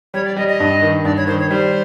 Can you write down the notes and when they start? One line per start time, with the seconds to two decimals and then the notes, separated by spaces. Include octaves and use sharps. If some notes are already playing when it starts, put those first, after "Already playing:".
0.14 G3 C#5
0.25 D5
0.36 G3 D#5
0.48 D#5
0.60 G2
0.82 D#3
1.04 G2 D5
1.17 C#5
1.27 D#3 C5
1.39 C#5
1.50 G3 C5